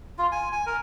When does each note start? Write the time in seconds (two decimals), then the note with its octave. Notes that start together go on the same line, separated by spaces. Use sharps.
0.18 F4
0.32 G#5
0.52 G#5
0.66 A#4